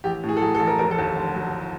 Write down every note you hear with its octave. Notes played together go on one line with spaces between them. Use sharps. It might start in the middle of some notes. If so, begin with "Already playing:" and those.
A1 G4
A2
G#4
A4
F#3 G#4
A4
A1
A#4
F1 A#4
A4
D#2
D3
F#3